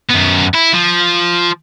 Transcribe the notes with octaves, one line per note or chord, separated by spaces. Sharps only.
F#2 B3
E4
F3